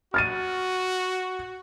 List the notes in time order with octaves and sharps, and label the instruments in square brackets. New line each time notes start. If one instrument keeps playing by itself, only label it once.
[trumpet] F#4 [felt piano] F6 A6 D#7